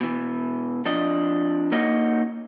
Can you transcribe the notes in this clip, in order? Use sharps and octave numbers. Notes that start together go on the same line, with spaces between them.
B2 E3
F2 F3 D4 D#5
A#3 C#4 D#4 F#4 D#5